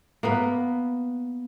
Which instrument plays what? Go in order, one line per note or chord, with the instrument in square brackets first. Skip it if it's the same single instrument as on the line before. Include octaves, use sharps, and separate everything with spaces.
[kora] A#3 B3 B4